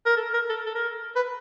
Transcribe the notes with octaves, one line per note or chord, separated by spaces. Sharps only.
A#4
A4
A#4
A4
A4
A#4
B4